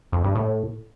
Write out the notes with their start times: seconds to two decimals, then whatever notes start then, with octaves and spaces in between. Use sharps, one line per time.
0.12 F2
0.24 G2
0.35 A2